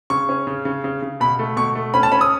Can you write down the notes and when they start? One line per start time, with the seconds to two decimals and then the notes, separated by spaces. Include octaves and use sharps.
0.10 C#3 C#6
0.29 C#4
0.47 C#3
0.65 C#3
0.84 C#3
1.02 C#3
1.20 B2 B5
1.39 A3
1.56 B2 C#6
1.75 A3
1.94 C#4 B5
2.03 A5
2.12 C#4 B5
2.21 D#6